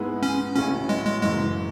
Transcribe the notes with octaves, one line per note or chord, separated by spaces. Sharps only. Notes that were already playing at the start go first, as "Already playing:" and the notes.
Already playing: G#2 G#3 B3 E4
C#4
A1 A2 F#3 C#4
G#3
G#3
F#1 F#2 E3 G#3